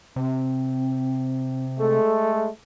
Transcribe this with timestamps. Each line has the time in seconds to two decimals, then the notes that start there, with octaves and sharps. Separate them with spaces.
0.16 C3 C4
1.79 G#3 A3 A4